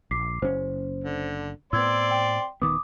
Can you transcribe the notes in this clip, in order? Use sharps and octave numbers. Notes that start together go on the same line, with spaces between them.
A#1 D6 B6 C7
F#1 C#4 C5
D3
A2 B3 C4 D5 C6 E6 G#6
G5
D#1 D#3 B3 D6 D#6